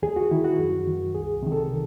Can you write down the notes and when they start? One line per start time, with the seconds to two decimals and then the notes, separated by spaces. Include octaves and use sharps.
0.03 D#2 G#4
0.16 F#4
0.31 D#3 E4
0.44 F#4
0.59 F#2
0.87 D#3
1.15 C2 G#4
1.43 C3 D#3
1.52 A4